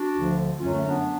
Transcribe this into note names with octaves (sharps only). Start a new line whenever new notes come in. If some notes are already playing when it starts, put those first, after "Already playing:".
Already playing: D4 F#4
D2 D3 F3
F#2 D3 F#3 C#4 F4
A3 C#4
B3 D4